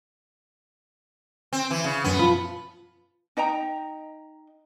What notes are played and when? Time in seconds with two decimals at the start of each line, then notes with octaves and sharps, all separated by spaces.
1.53 C4
1.71 E3
1.84 C#3
2.04 F#2 B3 C#4
2.19 F3 B5
3.37 D#4 D#5 G5 A#5